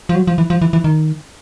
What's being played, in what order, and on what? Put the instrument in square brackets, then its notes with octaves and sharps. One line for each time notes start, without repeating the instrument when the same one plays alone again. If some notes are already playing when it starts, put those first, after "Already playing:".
[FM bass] F3
F#3
F3
E3
F3
E3
E3
D#3